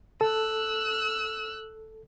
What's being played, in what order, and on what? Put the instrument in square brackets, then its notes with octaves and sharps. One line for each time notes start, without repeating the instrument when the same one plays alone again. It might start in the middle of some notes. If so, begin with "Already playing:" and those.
[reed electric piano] A4 [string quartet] E6 F#6